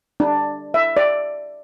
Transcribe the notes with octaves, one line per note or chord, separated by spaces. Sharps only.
D4
E5
D5